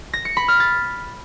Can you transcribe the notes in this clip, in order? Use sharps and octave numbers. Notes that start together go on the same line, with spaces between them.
A#6
C#7
B5
F6
A6